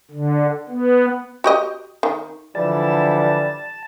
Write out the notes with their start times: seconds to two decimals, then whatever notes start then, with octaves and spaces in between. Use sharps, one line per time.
0.11 D3
0.69 B3
1.44 F#4 G4 D#5
2.03 D#3
2.55 D3 E3 F3 G3 A5